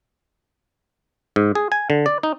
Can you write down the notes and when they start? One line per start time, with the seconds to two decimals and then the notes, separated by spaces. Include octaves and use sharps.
1.36 G#2
1.55 G#4
1.72 G#5
1.90 D3
2.06 D5
2.23 D#4